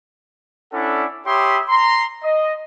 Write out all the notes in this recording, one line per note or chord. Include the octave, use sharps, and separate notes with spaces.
C#4 D4 E4 A4 D5 F#5
G4 C#5 E5 B5 C6 D#6
A#5 C6
D#5